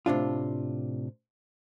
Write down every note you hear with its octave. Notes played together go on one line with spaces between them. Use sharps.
A2 C3 D4 F4